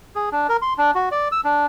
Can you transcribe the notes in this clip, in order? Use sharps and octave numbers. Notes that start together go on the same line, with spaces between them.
G#4
D4
A#4
C6
D4
F#4
D5
E6
D4